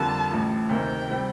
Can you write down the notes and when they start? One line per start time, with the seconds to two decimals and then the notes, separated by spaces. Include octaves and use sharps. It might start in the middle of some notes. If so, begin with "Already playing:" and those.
Already playing: F2 D3 G3 A#3 F4 A5
0.31 A1 A2 F3
0.69 D2 C3 D#3 A#3 G5
1.10 C3 G3